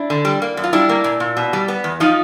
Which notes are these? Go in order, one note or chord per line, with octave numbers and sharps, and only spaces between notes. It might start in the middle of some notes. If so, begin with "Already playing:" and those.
Already playing: D4 E4
D3
G3
A#3
F#2
F4
G3 D4 E4
A#3
A#2
A#2
B2
G3
B3
E2
F3 D#4 F4